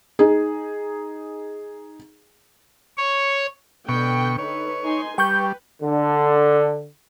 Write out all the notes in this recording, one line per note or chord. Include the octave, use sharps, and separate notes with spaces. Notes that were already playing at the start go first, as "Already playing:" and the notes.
D#4 G#4
C#5
B2 D3 G5 C#6
D#4 A4 B4 C#5
D#4 G#5 C6
G3 B4 G5 C#6 G6
D3